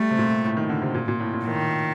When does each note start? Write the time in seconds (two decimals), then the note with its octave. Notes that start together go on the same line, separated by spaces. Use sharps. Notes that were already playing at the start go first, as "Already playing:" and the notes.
Already playing: G3 A3
0.11 C3
0.18 A#2
0.44 A2
0.57 D#3
0.69 D3
0.82 C3
0.95 A#2
1.08 A#2
1.20 A2
1.33 A#2
1.45 A2 D#3